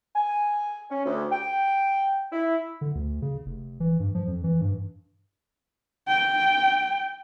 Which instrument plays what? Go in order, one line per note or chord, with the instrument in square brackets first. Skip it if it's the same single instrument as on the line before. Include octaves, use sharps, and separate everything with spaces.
[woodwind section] G#5
C#4
D2
G5
E4
[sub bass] D3
D2
C#3
F1
E3
G2
F3
F2
E3
G2
[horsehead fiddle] G5